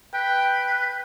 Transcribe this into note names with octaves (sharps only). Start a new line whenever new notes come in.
B4 G5